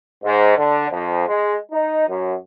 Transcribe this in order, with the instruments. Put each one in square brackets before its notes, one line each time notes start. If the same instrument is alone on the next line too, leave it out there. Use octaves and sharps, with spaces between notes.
[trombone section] G#2
D3
F2
G#3
D#4
F#2